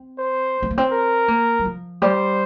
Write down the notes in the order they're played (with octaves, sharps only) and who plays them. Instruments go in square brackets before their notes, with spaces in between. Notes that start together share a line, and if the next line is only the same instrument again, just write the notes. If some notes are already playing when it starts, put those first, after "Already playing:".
Already playing: [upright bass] C4
[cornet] C5
[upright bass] C4
A#3
C4
[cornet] A#4
[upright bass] A#3
G3
F3
[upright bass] G3 [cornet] C5